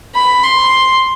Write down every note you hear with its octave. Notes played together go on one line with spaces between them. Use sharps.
B5
C6